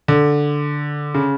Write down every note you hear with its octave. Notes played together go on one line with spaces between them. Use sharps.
D3
C#3